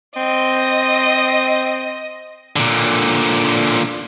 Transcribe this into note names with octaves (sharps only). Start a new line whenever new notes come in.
C4 D#5
A#2 D3